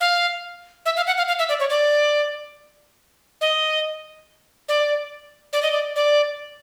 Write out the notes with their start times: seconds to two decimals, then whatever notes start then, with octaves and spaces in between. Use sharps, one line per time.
0.01 F5
0.86 E5
0.96 F5
1.07 F#5
1.17 F5
1.28 F5
1.39 E5
1.49 D5
1.60 C#5
1.70 D5
3.41 D#5
4.69 D5
5.53 D5
5.62 D#5
5.72 D5
5.96 D5